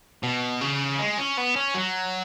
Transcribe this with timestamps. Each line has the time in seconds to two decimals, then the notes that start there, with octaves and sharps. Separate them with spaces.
0.23 B2
0.61 C#3
0.99 G#3
1.18 C#4
1.37 B3
1.56 C#4
1.75 F#3